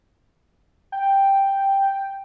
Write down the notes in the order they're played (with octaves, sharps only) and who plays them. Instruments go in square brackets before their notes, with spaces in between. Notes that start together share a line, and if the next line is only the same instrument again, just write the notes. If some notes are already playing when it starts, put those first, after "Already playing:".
[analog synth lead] G5